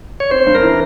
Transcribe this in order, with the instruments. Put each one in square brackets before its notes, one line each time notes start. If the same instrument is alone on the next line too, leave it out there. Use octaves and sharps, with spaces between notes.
[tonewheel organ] C#5
[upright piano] C4 [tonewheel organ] C5
[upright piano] G2
[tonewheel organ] A#4
[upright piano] E3